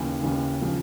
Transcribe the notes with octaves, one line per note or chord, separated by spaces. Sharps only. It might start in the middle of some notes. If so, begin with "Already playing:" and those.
Already playing: D#2 C#3 E3
D#2 C#3 E3
C#3 F3